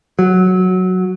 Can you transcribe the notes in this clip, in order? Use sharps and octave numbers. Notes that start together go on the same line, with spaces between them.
F#3